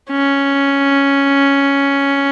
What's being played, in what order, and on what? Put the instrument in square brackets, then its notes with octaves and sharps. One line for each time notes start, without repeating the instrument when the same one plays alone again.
[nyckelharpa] C#4